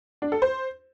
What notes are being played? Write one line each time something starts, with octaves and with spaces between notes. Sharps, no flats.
D4
A4
C5